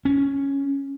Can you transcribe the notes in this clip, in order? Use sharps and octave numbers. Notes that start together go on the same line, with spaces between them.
C#4